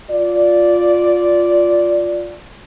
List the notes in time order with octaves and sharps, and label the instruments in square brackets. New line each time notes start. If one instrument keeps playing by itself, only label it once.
[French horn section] F4 D5